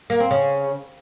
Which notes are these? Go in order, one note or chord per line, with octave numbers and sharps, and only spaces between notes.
A#3
C4
C#3